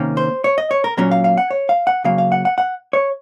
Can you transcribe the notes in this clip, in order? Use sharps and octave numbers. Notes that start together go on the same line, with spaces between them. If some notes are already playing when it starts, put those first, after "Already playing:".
Already playing: C3 D#3 A#3 C#4
C5
C#5
D#5
C#5
A#4
A#2 F#3 A#3 C#4 A#4
F5
F5
F#5
C#5
F5
F#5
C#3 F#3 A#3 F5
F5
F#5
F#5
F#5
C#5